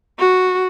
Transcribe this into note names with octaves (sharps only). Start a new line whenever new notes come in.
F#4